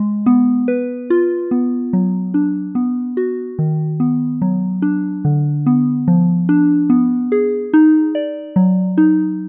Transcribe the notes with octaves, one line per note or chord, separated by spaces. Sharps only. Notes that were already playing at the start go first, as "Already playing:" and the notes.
Already playing: G#3
B3
B4
F4
B3
F#3
D4
B3
F#4
D#3
B3
F#3
D4
D3
B3
F3
D4
B3
G#4
D#4
D5
F#3
D#4